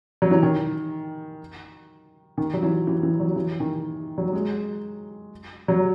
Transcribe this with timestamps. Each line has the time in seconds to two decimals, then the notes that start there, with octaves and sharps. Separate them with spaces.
0.22 F#3
0.31 E3
0.43 D#3
2.38 D#3
2.54 F#3
2.63 E3
2.87 E3
3.03 E3
3.20 F#3
3.36 E3
3.60 D#3
4.18 F#3
4.33 G#3
5.68 F#3